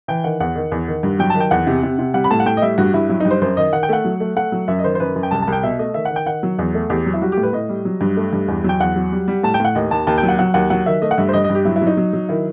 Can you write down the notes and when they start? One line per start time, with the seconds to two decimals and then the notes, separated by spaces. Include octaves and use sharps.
0.08 E3 G5
0.24 D#3 F#5
0.40 E2 F#5
0.56 D#3
0.72 E2
0.88 D#3
1.03 G2
1.19 F#3 G5
1.30 A5
1.35 D#3
1.40 G5
1.51 E2 F#5
1.67 C3
1.83 C3
1.99 C3
2.14 G3 F#5
2.24 B5
2.30 A2 A5
2.40 F#5
2.46 A2 G5
2.57 D#5
2.62 G3 E5
2.78 G2 F#4
2.94 G2 E4
3.09 F#3 E4
3.20 G2 D#4
3.31 C5
3.42 F#2 C5
3.57 D#3 D#5
3.73 D#3 F#5
3.83 G5
3.89 A3 F#5
4.05 F#3
4.20 A3
4.36 A3 F#5
4.52 F#3
4.68 F#2 E5
4.79 D#5
4.84 D#3 C5
4.95 C5
5.00 F#2 B4
5.16 F#2
5.23 G5
5.31 C2 A5
5.42 A5
5.47 C2
5.52 G5
5.63 B2 E5
5.79 A3 D#5
5.94 D#3 E5
6.05 F#5
6.11 D#3
6.16 G5
6.26 D#3 F#5
6.43 F#3
6.59 E2
6.74 A3
6.90 E2 G4
7.06 F#3
7.14 E4
7.22 G3 F#4
7.32 G4
7.37 A2
7.43 B4
7.53 A2 D#5
7.69 G3
7.85 F#3
8.01 G2
8.17 A3
8.33 G2
8.48 E2
8.64 F#3 G5
8.80 E2 F#5
8.96 F#3
9.12 G3
9.28 G3
9.43 A2 A5
9.54 G5
9.60 A2 F#5
9.75 D#2 D#5
9.91 D#2 A5
10.07 D#2 A5
10.18 G5
10.23 F#3
10.28 F#5
10.39 F#3 F#5
10.54 D#2 F#5
10.70 F#3 F#5
10.86 D#3 E5
11.02 A3 D#5
11.11 F#5
11.18 G2 E5
11.29 C5
11.33 G2 D#5
11.44 D#5
11.50 G2
11.55 G4
11.65 F#3 E4
11.76 E4
11.81 F#3
11.87 D#4
11.97 F#3
12.13 F#3
12.29 D#3 E4